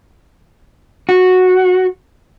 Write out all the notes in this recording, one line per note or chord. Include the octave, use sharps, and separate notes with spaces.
F#4